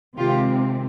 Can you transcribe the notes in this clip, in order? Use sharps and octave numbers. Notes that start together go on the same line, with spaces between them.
C3 D#3 G#3 C4 F4 G4